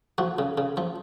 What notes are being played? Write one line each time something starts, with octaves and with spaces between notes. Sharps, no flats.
F3 F#4
C#3
C#3
F3